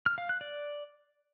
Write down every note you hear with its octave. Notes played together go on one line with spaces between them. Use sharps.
F6
F5
F#6
D5